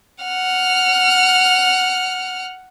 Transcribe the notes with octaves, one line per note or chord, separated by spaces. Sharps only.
F#5 F6